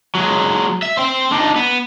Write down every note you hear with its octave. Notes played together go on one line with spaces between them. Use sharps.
F#3 G#3
E5
C5 G5
D4 D#4
B3